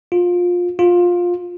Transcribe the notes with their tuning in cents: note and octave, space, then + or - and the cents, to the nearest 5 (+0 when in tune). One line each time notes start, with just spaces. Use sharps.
F4 +20
F4 +15